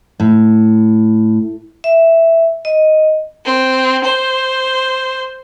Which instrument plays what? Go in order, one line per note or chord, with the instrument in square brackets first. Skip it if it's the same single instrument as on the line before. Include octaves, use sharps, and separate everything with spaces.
[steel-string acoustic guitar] A2
[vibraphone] E5
D#5
[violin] C4
C5